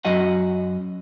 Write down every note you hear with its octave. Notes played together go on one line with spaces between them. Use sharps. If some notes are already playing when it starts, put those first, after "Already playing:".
F#2 F#3 F#4 D#5 F#5